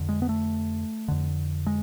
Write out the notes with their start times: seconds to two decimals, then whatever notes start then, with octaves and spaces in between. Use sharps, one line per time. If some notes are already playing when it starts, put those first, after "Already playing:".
Already playing: F2 D3
0.09 G#3
0.22 B3
0.29 A3
1.08 F2 D3
1.66 G#3